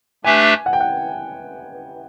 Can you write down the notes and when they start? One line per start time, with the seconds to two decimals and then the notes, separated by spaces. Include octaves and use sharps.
0.25 A3 D4 G4 B4 E5 G#5
0.66 F#5
0.73 G5
0.81 F#5